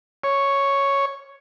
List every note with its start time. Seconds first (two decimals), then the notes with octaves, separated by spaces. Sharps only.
0.24 C#5